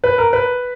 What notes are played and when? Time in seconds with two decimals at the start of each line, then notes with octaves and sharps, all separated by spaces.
0.04 B4
0.18 A#4
0.33 B4